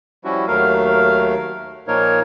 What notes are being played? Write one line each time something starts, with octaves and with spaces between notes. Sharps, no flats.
F3 G3 C#4 E4 F#4
D#2 F#3 A3 A#4 F5
A#2 F3 A#3 D#4 A#4 C#5